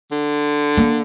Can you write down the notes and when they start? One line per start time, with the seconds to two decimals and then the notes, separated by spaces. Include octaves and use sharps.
0.12 D3
0.77 A#3